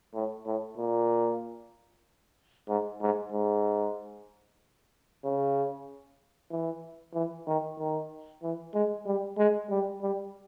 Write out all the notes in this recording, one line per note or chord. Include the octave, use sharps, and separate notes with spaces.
A2
A2
A#2
G#2
G#2
G#2
C#3
E3
E3
D#3
D#3
E3
G#3
G3
G#3
G3
G3